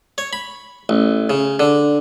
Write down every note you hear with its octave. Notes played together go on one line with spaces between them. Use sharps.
C#5
B5
A1
C#3
D3